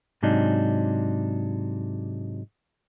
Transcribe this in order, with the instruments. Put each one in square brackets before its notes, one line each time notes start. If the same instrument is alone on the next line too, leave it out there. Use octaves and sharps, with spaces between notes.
[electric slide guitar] G#2 C3 F#3 D4 D#4